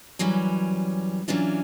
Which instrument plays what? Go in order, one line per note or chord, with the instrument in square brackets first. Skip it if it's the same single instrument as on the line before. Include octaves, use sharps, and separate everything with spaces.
[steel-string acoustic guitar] F#2 E3 F#3 G3 C#4
E3 F#3 C#4 D4 F4